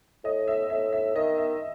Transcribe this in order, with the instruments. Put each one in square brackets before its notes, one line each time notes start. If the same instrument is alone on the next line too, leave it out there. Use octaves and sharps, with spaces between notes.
[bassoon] A2 [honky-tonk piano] D#5
[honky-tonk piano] E5
[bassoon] A2 [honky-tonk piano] E5
[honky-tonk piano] E5
[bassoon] D#3 [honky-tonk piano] D#5
[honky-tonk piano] E5